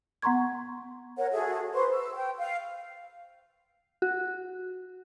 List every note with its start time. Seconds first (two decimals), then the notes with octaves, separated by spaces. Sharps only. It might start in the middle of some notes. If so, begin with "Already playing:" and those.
0.22 B3 F#5 A#5 C6 C#6 G#6
1.16 A#4 C#5 F#5
1.31 F#4 G#4 A4 E5
1.73 B4 C5 C6 C#6
1.90 E6
2.15 G5
2.39 F5
4.02 F#4